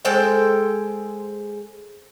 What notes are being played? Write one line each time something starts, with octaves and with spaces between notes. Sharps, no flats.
G#3 A4 C5 G5